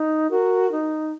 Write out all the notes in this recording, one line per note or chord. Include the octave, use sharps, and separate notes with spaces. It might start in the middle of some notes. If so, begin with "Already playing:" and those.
Already playing: D#4
F#4 A#4
D#4